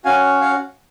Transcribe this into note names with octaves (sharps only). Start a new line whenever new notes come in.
C#4 F#4 F5 G#5
C#5 F5